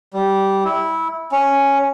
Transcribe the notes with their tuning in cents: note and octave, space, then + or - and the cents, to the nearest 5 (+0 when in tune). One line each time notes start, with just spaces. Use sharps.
G3 -10
E4 -15
C#4 +0